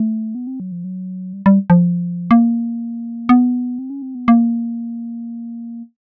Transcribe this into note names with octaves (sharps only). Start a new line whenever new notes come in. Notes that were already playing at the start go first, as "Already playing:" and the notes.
Already playing: A3
B3
C4
F#3
F3
F#3
G3
G3
F3
A#3
B3
C4
C#4
C4
B3
A#3